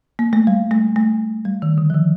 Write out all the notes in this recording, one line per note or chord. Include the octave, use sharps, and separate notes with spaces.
A#3
A3
G3
A3
A3
G3
D#3
D3
F3
D#3